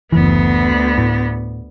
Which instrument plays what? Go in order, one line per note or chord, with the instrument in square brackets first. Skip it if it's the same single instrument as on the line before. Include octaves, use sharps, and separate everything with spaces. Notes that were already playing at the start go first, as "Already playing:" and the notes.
[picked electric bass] F#1 E3 [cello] D2 B3
[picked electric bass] A2